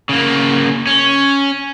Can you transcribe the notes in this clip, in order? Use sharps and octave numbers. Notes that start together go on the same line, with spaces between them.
C#3 A#3
C#4